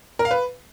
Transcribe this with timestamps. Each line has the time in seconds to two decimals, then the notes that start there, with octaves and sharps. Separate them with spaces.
0.19 A#4
0.25 F5
0.31 B4